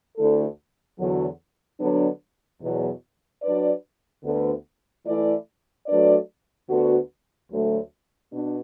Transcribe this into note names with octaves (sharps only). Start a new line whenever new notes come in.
D2 D3 A3 E4 A4
E2 D3 F#3
D3 F#3 B3 D4
E2 B2 F#3
F#3 D4 B4 D5
D2 D3 B3
E3 A3 E4 D5
F#3 A3 D4 B4 D5
D2 D3 B3 F#4
D2 D3 F#3 A3
B2 B3 D4